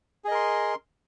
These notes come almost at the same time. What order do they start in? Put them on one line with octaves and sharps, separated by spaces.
G#4 D#5 A#4 C6